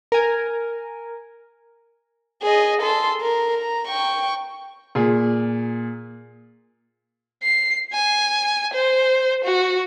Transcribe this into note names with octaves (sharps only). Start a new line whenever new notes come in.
A#4 G#5
G#4 D#5
A4 C6
A#4
A#5
G5 C#6
A#2 G#4
C7
G#5
C5
F#4